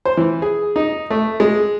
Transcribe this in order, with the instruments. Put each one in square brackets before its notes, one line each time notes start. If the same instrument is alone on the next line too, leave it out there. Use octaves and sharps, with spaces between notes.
[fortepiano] C5
E3
G#4
D#4
A3
G#3